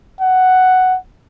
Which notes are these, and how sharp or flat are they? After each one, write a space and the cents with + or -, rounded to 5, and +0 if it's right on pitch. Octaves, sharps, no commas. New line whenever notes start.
F#5 +5